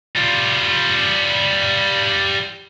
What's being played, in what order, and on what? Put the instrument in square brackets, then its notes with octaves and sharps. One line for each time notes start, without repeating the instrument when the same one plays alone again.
[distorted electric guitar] G3 F4